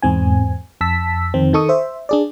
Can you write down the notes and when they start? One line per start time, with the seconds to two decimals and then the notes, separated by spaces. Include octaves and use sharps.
0.02 E2 G#2 C4 G#5
0.81 F2 A5 E6 B6
1.34 F2 D#3 C4
1.53 D#3 D#4 A4 C#6 D#6
1.69 C5 E5
2.09 D4 G#4 D5